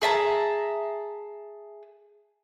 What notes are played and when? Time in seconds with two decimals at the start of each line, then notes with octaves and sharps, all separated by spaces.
0.02 G#4 E5 A5 A#5